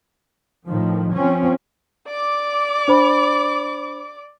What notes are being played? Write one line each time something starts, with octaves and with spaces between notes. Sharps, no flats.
A2 D#3 F3
F3 C4 C#4
D5 D6
D4 C5 B5